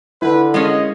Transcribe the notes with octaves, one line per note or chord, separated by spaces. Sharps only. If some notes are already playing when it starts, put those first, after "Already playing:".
D3 E4 B4
G#3 A#3 C#4 D#5